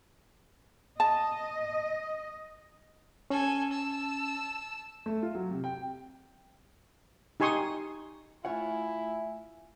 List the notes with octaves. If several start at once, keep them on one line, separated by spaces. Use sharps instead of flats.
D#5 A5
C#4 A4 G#5
A5 E6
A3
F4
F#3
C3
G5
D#4 G4 G#5 C6 C#6 D#6
A3 E4 F4 C#5 E5 F#5 G#5